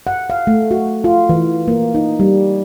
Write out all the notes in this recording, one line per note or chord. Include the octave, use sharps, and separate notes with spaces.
F#5
F5
A3
F#4
F4
E3
A#3
D#4
G3